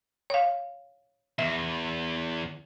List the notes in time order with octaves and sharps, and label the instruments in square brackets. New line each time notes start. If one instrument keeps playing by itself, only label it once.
[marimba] C#5 F5
[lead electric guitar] E2 [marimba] E5